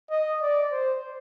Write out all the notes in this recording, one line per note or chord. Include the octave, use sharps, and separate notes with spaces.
D#5
D5
C5